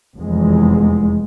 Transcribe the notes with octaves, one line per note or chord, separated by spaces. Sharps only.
F1 E2 G#3